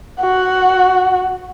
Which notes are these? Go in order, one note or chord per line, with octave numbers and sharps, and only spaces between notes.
F#4 F#5